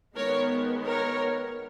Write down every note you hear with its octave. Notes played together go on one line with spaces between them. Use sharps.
D#3 G#3 B3 A#4 C#5
A#4 C#5